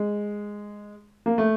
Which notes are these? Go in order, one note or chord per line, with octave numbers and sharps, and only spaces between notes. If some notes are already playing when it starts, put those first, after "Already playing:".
Already playing: G#3
A#3
A3